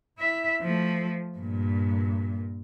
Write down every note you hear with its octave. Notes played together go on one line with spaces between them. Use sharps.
E4 E5
F3 A3
G2 A#2